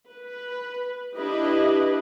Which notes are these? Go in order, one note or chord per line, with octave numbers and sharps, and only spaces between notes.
B4
D4 E4 G4 B4 D#5